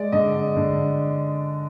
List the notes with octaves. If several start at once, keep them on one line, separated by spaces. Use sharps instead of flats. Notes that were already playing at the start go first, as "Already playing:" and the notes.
Already playing: G#3 D5
D3 D#5
D3